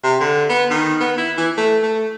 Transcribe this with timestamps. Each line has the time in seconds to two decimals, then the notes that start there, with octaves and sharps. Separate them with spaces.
0.04 C3
0.20 D3
0.49 B3
0.70 D#3
1.01 B3
1.18 E4
1.38 E3
1.57 A3
1.83 A3